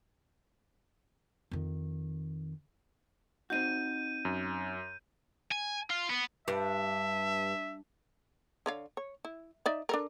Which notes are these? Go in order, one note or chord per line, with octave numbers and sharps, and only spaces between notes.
F2 D#3
C4 D#4 F#4 G6 D#7
F#2
G#5
F4
B3
G2 E5
D3 C#5 F5
C#5
E4
D#4 D5 E5
D4 A4 A#4